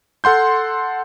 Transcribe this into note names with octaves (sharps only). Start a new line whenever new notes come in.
A4 F#5 C6 G6